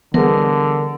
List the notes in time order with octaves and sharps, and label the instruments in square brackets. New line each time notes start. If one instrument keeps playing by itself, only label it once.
[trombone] D3 [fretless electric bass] E3 G3 [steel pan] B3 G#4 [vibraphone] A#4